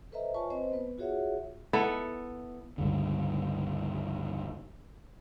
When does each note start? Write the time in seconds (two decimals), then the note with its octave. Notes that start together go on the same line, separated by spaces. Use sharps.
0.12 A4 B4 C5 D#5 E5 A#5
0.34 F4 B4 C#5 G#5 A5 C#6
0.50 C4 B4 C5 D#5
0.72 B3 B4
0.98 F4 F#4 G#4 C#5 E5 F#5
1.73 B3 E4 A4
2.78 C#2 G2 D3